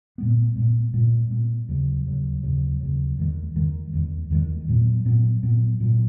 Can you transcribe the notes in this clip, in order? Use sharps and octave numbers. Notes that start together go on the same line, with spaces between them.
A#2 G#3 B3
A#2 G#3 B3
A#2 G#3 B3
A#2 G#3 B3
D#2 C#3 F#3
D#2 C#3 F#3
D#2 C#3 F#3
D#2 C#3 F#3
E2 D#3 G#3
E2 D#3 G#3
E2 D#3 G#3
E2 D#3 G#3
A#2 F#3 B3
A#2 F#3 B3
A#2 F#3 B3
A#2 F#3 B3